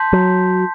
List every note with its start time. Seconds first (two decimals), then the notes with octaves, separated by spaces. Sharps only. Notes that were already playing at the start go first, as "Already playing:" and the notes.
Already playing: A5 C6 G6 B6
0.13 F#3